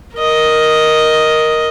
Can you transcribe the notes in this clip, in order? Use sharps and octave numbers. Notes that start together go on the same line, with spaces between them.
A#4 D#5